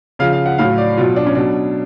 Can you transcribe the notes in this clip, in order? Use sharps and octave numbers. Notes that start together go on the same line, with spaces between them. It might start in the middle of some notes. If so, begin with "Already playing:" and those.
C#3 F3 F5
F5
F#5
A2 F#3 F5
D5
B2 F#3 F4
D4
C#4
B2 F#3 D4